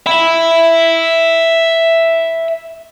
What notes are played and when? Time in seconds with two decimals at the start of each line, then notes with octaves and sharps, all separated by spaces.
0.06 E5 B5